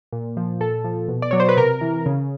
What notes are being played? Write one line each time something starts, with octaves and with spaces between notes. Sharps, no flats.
A#2
F3
A#2 A4
F3
B2
D5
F#3 C#5
C5
B4
C3 A#4
E3
C#3